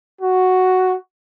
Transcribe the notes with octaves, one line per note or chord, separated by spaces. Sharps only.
F#4